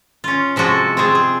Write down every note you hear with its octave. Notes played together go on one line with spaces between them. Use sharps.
C#4 F4
C3 F3 G#3 F#4 A4
C4 F4 G#4
G#4